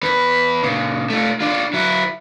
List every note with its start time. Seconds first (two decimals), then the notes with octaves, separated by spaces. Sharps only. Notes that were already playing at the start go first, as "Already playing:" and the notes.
0.03 E2 B4
0.63 A#2 C#3
1.10 A3 F4
1.40 D4 F4
1.73 F#3 E4